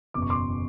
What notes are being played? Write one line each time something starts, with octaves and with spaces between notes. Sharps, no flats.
F#1 E2 B2 D6
C#6
C6 D6